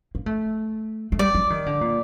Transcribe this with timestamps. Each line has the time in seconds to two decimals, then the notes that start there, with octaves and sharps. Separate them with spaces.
0.15 A#3
0.26 A3
1.12 A3
1.19 G3 D5
1.35 F#3
1.50 D#3
1.66 D3
1.81 A#2